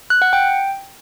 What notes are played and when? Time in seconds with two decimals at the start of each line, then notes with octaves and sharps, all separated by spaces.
0.10 F#6
0.22 F#5
0.33 G5